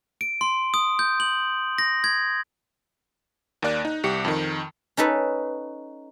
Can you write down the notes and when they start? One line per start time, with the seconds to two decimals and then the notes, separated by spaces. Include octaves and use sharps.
0.21 D7
0.41 C6
0.74 D#6
0.99 G6
1.20 F#7
1.78 A#6
2.04 G#6
3.62 D#2 A#3 D5 F#6
3.85 D#4
4.04 C2 G4 C#7
4.25 F2 D#3
4.97 C#4 D#4 A4 B4